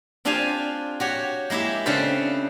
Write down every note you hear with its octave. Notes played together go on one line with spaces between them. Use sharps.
C4 D4 F4 G4 F5 G#5
F#4 G4 C#5
G#3 A#3 E4 G4 E5
C#3 C4 D4 A4 B4 C5